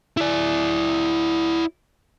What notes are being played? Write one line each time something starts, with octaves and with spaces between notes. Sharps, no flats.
E4 D5